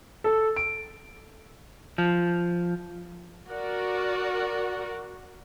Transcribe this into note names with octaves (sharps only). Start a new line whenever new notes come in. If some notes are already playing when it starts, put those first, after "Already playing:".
A4
D7
F3
F#4 A#4 D5